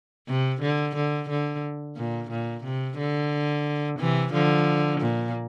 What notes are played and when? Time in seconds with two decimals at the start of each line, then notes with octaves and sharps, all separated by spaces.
0.28 C3
0.61 D3
0.95 D3
1.29 D3
1.97 A#2
2.30 A#2
2.64 C3
2.98 D3
3.99 C3 E3
4.33 D3 F3
5.01 A#2